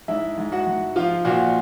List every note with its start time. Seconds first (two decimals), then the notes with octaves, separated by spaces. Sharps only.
0.08 G#2 E4 E5
0.38 G#2
0.52 F#4 F#5
0.67 G#2
0.96 F3 F4 F5
1.25 A#2 F#4 F#5